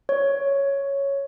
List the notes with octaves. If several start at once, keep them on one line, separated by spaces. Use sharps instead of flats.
C#5